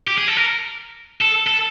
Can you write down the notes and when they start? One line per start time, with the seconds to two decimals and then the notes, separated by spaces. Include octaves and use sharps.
0.08 G4
0.18 G#4
0.28 A4
0.37 A#4
1.22 A4
1.47 A4